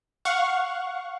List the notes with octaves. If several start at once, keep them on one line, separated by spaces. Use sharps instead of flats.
F5 F#5 C#6